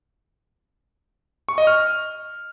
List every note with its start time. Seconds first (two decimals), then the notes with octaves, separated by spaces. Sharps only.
1.49 C#6
1.58 D#5
1.67 F6